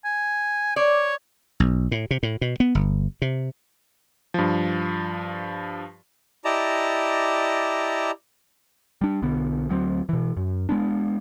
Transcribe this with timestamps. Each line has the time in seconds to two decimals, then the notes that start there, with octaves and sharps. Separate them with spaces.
0.05 G#5
0.76 C#5 D5
1.60 B1
1.92 A2
2.11 C3
2.23 A2
2.41 B2
2.60 B3
2.75 G1
3.22 C3
4.34 G2 F3
6.45 E4 G4 D5 D#5 A5 A#5
9.01 G3 D4
9.22 B1 D3 B3
9.69 D2 F#3 A3 C4
10.09 B2 E3
10.37 F#2
10.69 G#3 B3 D4